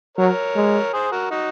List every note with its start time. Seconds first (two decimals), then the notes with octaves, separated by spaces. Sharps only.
0.17 F#3 A#4 C#5
0.56 G#3
0.93 G#4 C5
1.12 F#4 A#4
1.31 D#4 F#4